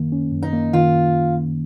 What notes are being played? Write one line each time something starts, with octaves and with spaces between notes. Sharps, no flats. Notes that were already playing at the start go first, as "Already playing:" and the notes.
Already playing: F#2 D#3 A#3
C#4
F#2
D#4
A#3
D#3 F4